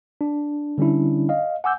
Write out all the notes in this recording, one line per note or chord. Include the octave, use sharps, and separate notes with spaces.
D4
D3 G3 C#4 D4 E4
D#5 F5
F#5 G#5 D6 E6 G6